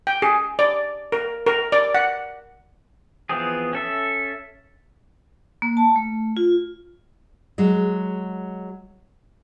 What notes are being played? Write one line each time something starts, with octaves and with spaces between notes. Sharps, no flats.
G5
G#4
D5
A#4
A#4
D5
F#5
E3 F3 B3 C4 G#4
C#4 A4 E5
A#3
A5
A3
F4
F#3 G#3